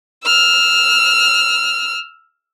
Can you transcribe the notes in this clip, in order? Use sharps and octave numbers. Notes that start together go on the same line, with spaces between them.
E6 F6